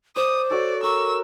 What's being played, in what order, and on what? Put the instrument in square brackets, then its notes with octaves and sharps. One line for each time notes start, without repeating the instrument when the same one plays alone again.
[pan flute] C5 [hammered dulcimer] D5 [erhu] D#6
[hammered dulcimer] F#4 A4 C#5 [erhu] D5
[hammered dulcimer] A#4 [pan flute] C#6 [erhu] E6